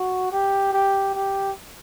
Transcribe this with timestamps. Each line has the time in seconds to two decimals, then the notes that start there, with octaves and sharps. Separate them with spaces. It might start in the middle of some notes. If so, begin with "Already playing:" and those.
Already playing: F#4
0.32 G4
0.73 G4
1.14 G4